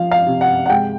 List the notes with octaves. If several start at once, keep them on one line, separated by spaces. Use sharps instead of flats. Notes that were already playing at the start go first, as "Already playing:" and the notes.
Already playing: F3 F5
F5
C3
F#5
F#5
G#3 G5